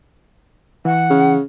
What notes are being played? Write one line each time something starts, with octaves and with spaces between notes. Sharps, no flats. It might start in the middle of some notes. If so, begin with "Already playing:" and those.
E3 F#5
C#3